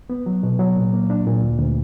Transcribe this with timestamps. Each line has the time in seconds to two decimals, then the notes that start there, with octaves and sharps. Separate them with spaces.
0.10 B3
0.26 F#3
0.43 B2
0.59 F#3
0.76 A#2
0.93 A#3
1.10 D4
1.26 A#2
1.42 D2
1.59 D2